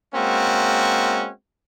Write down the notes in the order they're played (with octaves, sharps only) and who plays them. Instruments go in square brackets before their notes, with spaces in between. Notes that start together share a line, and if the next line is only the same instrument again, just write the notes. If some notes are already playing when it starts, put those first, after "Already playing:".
[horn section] G#3 A#3 C4 C#4 F#4